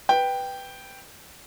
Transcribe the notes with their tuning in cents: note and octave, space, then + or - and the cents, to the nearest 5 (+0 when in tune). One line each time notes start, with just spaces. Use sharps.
B4 +0 G5 +0